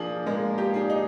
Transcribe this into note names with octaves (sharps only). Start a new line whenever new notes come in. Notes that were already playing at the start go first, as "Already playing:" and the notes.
Already playing: F3 A#3 D4 G#4
G#3 A#3
G4
D4 G#4
D#4